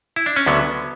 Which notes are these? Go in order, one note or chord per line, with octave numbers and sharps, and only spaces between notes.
E4
D4
C#4
D2 D3 F#3 B3